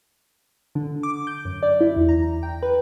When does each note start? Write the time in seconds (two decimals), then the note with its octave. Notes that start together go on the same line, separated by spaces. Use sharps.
0.75 D3
1.03 D6
1.27 G6
1.45 F#2
1.63 D5
1.81 E4
1.96 E2
2.09 A#5
2.43 G5
2.63 B4